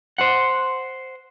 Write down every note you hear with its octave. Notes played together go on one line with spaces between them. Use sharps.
C5 F#5